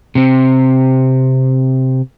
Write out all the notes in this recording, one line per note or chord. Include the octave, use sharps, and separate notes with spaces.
C3 C4